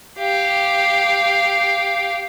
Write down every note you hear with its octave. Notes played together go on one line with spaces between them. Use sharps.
G4 F5